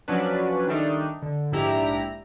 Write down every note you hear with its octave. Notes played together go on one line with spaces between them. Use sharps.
F3 F#3 C#4 D4 B4
D#3 G3 A3 D4 D#4
D3
A#1 G#2 D4 E4 G4 A#5